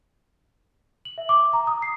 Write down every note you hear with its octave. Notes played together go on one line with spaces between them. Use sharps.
F#7
E5
D6
A#5
D#6
C7